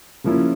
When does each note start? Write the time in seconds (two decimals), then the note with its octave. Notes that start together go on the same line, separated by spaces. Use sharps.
0.24 C#3 F3 A#3 C#4 E4